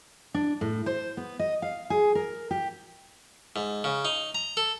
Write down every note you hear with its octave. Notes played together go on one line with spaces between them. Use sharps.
D4
A2
C5
B3
D#5
F5
G#4
A#4
G4
G#2
C#3
D#4
A#5
A4